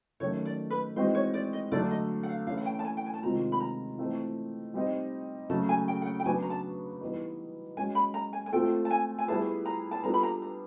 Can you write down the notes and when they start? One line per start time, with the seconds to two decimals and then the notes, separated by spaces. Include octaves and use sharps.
0.20 D#3 F#3 A3 C#4 C#5
0.46 D5
0.71 B4
0.96 E3 G#3 C4 D#4 F#4 C5
1.15 C#5
1.34 D5
1.53 D#5
1.72 D3 F#3 A3 D4 D5
1.91 D#5
2.23 F#5
2.29 F5
2.47 E3 A3 C#4 E4 F5
2.58 F#5
2.66 G5
2.79 A5
2.85 G#5
2.97 G5
3.06 G#5
3.14 A5
3.23 C3 D#3 G#3 C4 F4 A#5
3.52 B5
3.60 A#5
3.98 E3 A3 C4 D#4
4.74 G3 C4 D#4
5.50 C#3 F#3 A3 A5
5.69 G#5
5.88 G5
6.02 F#5
6.06 G5
6.20 G5
6.26 C#3 F#3 B3 D4 F#4 G#5
6.42 A#5
6.50 A5
7.01 E3 G3 B3 D#4
7.77 G#3 C#4 F#4 G#5
7.95 B5
8.14 A#5
8.33 G#5
8.46 G#5
8.52 A3 C4 F4 A4 G5
8.85 A5
8.90 G#5
9.18 G#5
9.28 G3 B3 E4 G#4 B4 A5
9.66 A#5
9.91 A5
10.04 G3 B3 D4 F4 A4 A#5
10.14 B5
10.23 A#5
10.42 A#5